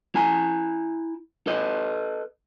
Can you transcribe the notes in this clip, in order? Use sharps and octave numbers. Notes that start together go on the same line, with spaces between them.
E4 G#5 A#5
A4 B4 D#5